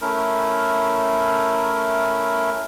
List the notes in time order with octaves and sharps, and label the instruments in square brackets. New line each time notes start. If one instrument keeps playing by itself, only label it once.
[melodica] A3 C#4 E4 A#4